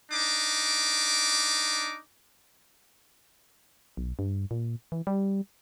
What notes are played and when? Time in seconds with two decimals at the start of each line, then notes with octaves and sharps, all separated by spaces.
0.12 D4 D#4 D6
3.97 B1
4.19 G2
4.51 A#2
4.92 E3
5.07 G3